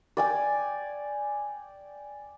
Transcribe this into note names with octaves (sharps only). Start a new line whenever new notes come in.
D5 G5 G#5